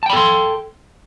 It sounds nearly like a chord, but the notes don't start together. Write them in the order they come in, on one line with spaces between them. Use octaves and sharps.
A5 G5 B5 A4 C6